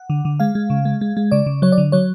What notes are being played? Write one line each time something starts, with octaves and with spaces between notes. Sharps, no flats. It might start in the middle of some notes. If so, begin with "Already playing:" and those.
Already playing: F#5
D3
D3
G#3 F5
G#3
C#3
G#3
G#3
G#3
C#3 D5
C#3
F#3 C#5
D5
D3
F#3 C#5